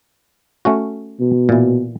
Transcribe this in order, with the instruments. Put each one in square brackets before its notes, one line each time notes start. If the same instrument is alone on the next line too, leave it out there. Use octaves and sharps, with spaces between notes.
[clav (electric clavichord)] A3 C#4 F#4
[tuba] B2
[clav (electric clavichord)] A#2 E3